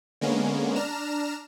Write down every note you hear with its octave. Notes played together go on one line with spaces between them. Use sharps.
D3 G#3 A#3 B3 C#4
D4 A#5 F6 E7